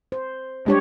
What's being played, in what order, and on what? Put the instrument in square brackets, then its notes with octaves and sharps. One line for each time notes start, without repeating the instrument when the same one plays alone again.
[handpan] C5
[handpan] G3 G4 C#5 [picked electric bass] G#3 D4